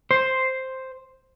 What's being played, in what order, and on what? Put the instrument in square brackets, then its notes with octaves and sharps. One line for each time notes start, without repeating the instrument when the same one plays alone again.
[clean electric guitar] C5